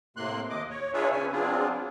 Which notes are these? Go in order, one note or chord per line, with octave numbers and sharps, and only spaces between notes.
A2 C3 A#3 C6 F#6
D#2 D#5 D6
C#5
D4 F4 G#4 B4 C#5 E5
C#3 C4 B4 G#5
F#3 B3 C4 D4 F4 G#4